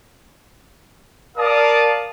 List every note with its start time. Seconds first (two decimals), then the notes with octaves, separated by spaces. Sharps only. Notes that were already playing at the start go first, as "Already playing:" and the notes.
1.37 A#4 D5 F5 A5 D#6